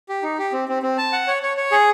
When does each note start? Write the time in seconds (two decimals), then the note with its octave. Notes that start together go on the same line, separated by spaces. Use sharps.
0.09 G4
0.23 D#4
0.38 G4
0.53 C4
0.68 C4
0.83 C4
0.98 A5
1.13 F#5
1.27 C#5
1.42 C#5
1.57 C#5
1.72 G#4